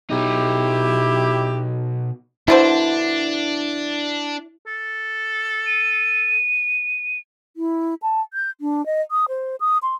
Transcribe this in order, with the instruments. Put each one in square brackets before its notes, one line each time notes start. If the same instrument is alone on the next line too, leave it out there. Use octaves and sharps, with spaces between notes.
[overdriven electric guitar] B2 D#4 [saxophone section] E4 G4
[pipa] B2 D3 C5 [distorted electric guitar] D4 [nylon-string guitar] E4
[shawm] A4
[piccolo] D#7
[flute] E4
A5
G6
D4
D#5
D#6
C5
D#6
C6